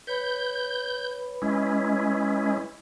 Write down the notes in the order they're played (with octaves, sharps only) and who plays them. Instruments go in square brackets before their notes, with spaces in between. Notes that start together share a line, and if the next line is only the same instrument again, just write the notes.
[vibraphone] B4 C#5 B5 [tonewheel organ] G6
[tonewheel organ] G#3 C#4 E4